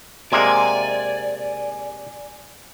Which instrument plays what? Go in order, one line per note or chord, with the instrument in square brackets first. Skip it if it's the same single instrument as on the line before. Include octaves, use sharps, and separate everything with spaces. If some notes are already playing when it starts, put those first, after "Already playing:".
[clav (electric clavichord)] C3 G#3 A#3 [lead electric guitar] D5 [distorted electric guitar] G#5